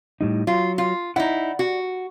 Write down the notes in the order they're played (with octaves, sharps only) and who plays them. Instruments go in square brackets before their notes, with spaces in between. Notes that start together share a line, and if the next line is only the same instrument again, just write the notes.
[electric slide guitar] A2 G3 D#4
[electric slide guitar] F#3 [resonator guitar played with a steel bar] F4
[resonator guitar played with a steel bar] F4
[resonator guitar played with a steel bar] D#4 E4 [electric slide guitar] D5 F#5
[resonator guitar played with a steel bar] F#4